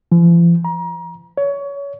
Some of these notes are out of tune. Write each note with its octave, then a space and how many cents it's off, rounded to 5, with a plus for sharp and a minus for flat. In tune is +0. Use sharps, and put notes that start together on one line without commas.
F3 -45
A#5 +30
C#5 +25